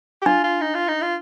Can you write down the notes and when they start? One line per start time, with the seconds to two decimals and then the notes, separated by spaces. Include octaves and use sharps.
0.22 G4
0.26 D4 F4
0.44 F4
0.61 D#4
0.75 F4
0.88 D#4
1.02 F4